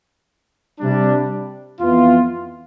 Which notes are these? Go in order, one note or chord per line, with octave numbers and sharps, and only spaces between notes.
C3 G3 D4
F2 E3 B3 F4